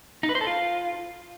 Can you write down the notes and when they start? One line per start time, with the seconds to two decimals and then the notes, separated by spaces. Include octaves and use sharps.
0.23 D#4
0.29 B4
0.35 C5
0.41 A4
0.47 F4